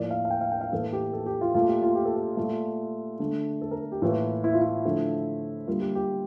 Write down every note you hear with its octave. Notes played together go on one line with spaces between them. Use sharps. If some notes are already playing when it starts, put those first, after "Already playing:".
Already playing: A2 F3 A#3 D5
F5
F5
G5
F5
G5
F5
A2 E3 A#3 A4
G4
A4
G4
F4
A#2 A3 F4
G4
F4
G4
A4
G4
A#2 A3 F4
D3 A3
A4
A#4
G4
A2 E3 A#3 F4
E4
F4
E4
D3 F3 A3
D3 G3 A#3 F4
G4
G4